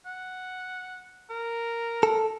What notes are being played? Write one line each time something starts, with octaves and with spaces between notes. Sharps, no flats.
F#5
A#4
A4